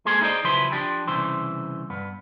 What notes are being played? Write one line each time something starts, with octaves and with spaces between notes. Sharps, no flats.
G#3 A#3 G#4 A4 C5
D#4 E4 G#4 C5 D5 D#5
C#3 F3 F#3 E4 B4 C5
F3 D4 G4
C2 C#3 E3 C5
G2 B3